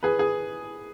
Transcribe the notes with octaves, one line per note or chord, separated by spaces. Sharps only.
G#4 B4
G#4